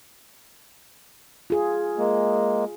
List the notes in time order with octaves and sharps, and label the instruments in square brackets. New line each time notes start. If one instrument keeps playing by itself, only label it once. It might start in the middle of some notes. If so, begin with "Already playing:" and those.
[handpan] F4 G#4
[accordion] G#3 A#3